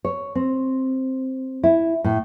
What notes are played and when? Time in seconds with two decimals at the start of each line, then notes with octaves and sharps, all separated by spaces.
0.04 C#5
0.35 C4
1.63 E4
2.04 A2